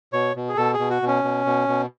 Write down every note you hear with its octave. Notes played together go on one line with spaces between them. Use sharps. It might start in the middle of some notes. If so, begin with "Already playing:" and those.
B2 C#5
B2
G#4
B2 A4
G#4
B2
F#4
B2
C#4
B2
B2
B2